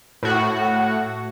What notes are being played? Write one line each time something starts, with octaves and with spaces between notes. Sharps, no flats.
A2 F#4